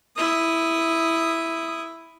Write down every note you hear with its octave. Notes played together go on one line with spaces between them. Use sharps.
E4 D#6